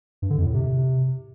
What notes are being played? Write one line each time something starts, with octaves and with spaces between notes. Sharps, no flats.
G2
D3
F2
A2
C3